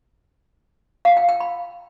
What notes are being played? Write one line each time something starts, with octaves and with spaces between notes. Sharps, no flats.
F5
G5
G5
B5